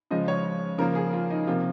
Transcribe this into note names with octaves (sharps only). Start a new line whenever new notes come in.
C#3 F3 G#3 D#5
C#5
C#3 F3 A#3 A#4
G#4
F4
D#4
C3 F3 A#3 F4